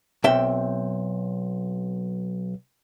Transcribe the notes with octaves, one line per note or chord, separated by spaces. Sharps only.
B1 C4 E5 G5